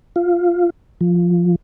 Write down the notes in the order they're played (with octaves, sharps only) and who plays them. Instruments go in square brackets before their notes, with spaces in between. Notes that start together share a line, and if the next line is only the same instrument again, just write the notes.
[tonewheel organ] F4
F3